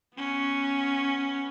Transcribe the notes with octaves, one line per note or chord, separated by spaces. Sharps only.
B3 C#4